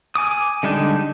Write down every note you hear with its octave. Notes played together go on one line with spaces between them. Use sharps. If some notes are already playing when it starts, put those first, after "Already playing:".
G#5 D6 D#6
D3 G3 G#3 D4 D#4